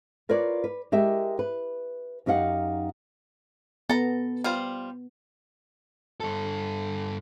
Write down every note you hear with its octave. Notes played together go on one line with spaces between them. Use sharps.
F4 A#4 B4 C#5 D5
B4
G#3 G4 A#4 E5
B4
F#2 D#4 G4 F5 F#5
B3 A4 A#5
G3 F4 C5
G2 A4